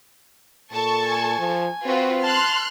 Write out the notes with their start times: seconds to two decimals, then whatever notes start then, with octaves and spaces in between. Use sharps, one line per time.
0.73 A#2 A4 A5 C#6
1.06 G#5
1.39 F3
1.86 C4 F4 F#4 B4
2.22 A5 C6 F6 F#6